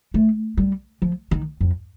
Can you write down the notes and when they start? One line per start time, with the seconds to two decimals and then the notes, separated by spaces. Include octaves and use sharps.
0.14 A3
0.57 G3
1.02 F3
1.31 D#3
1.61 F2